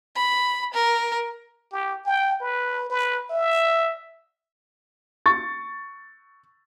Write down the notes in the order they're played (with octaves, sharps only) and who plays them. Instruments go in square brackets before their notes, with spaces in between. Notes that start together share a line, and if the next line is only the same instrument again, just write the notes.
[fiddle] B5
A#4
[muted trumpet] G4
G5
B4
B4
E5
[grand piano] C#6 A6